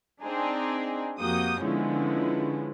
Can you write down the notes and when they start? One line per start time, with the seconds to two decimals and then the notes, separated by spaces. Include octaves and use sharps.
0.23 C4 D4 D#4 G#4
1.20 F2 A#3 F#4 G4 D#6 G6
1.63 D3 F3 G#3 B3 C#4 E4